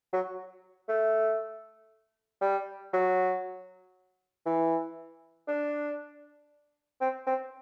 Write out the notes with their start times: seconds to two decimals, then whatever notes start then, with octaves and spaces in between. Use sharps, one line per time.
0.13 F#3
0.89 A3
2.41 G3
2.93 F#3
4.46 E3
5.48 D4
7.01 C4
7.27 C4